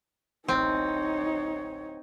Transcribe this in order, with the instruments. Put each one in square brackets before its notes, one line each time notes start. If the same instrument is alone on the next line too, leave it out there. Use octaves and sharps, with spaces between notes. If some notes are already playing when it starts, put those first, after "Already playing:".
[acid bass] D1 [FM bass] A1 [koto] C4 [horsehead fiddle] D#4 C#5